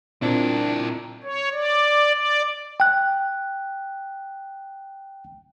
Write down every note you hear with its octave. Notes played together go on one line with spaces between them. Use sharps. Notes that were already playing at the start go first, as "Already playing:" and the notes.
A#2 C4 D4 E4 F4 A#4
C#5
D5
D5
G5 F#6